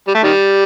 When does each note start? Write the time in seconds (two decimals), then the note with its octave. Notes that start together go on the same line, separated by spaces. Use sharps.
0.08 G3
0.15 A3
0.23 D#3 G3